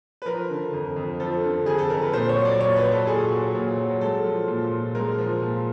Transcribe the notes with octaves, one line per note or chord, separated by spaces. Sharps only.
B4
F3 A#4
D3
F2
F2
F3 A4
D3
F2 G#4
A4
F2 A#4
B4
A#2 C5
C#5
F#3
D5
A#2 C#5
B4
F#3
A4
A#2 G#4
F#3
A#2
F#3
G#3 A4
F3
A#2
A#2
G#3 A#4
F3
A#2